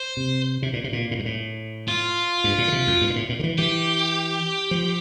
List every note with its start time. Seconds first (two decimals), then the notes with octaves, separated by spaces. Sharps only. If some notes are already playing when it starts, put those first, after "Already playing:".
Already playing: C5
0.17 C3
0.62 C3
0.73 A#2
0.84 C3
0.93 A#2
1.11 A2
1.19 G2
1.25 A2
1.88 F4
2.44 G2
2.58 A#2
2.68 D3
2.72 C3
2.87 F2
3.01 G2
3.10 A#2
3.16 A2
3.29 A#2
3.39 D3
3.43 E3
3.58 E3 G4
4.71 F3